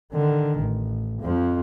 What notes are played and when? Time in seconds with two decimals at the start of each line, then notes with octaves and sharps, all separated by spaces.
0.12 D3 D#3
0.59 A1
1.21 F2 F3